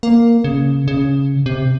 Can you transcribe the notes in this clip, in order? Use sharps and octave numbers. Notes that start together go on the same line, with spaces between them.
A#3
C#3
C#3
C3